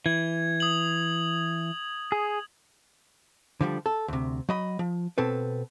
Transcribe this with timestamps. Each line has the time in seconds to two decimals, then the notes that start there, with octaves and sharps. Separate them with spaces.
0.06 E3 G#6
0.60 D#6 F#7
2.12 G#4
3.61 D3 F3 G3
3.86 A4
4.08 D2 C3
4.49 F#3 D#5 B5
4.79 F3
5.18 B2 C4 A4 B4